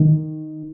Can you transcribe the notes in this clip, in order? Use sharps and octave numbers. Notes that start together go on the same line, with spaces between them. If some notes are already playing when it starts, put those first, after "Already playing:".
Already playing: D#3